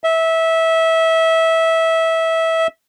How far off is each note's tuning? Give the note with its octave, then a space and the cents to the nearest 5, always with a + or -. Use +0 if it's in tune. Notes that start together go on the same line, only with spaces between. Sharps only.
E5 -20